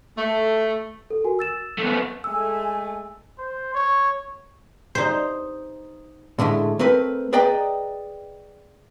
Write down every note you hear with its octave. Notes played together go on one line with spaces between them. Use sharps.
A3
A4
F#4 A#4 G#5
E6 A6 E7
A3 B3
G#3 A3 G#5 E6
C5
C#5
D#4 C5
A2 D3 G#3 A3
A3 C4 A#4 B4
G#4 B4 D5 D#5 G5 A#5